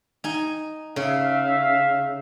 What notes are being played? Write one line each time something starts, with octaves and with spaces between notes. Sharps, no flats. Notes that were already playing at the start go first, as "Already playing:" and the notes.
D#4 G#5
C#3 E5 F5